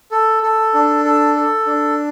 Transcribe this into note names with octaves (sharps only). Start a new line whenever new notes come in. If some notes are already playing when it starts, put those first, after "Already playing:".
A4
A4
D4
A4
A4
D4